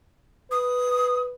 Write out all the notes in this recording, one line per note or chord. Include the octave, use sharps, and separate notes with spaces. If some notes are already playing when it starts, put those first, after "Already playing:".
B4 D#6